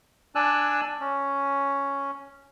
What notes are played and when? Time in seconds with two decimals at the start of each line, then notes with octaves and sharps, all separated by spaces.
0.35 D4 D5 G#5 E6 F#6
1.00 C#4